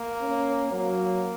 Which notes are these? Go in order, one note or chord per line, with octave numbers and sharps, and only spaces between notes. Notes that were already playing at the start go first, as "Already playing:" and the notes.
Already playing: A#3
C#4
F#3 A#3